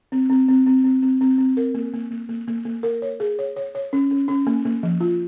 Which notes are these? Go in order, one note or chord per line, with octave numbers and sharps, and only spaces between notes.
C4
C4
C4
C4
C4
C4
C4
C4
A#4
A#3
A#3
A#3
A#3
A#3
A#3
A#4
C#5
G#4
C#5
C#5
C#5
C#4
C#4
C#4
A#3
A#3
F3
F4